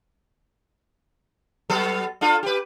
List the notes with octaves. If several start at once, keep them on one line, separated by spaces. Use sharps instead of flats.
F#3 B3 A4
D4 F4 A4
G4 B4